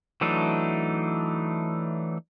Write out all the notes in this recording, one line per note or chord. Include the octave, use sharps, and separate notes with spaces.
E3 F#3 A3 D4 D#4